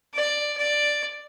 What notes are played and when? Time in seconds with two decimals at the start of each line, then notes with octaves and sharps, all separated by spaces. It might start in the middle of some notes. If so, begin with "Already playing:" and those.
0.14 D5
0.57 D5